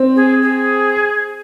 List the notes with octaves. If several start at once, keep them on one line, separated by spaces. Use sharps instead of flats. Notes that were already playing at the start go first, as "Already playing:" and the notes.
Already playing: C4
G#4
G#4